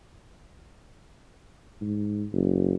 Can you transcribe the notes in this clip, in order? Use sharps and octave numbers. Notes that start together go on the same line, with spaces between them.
G#2
F#1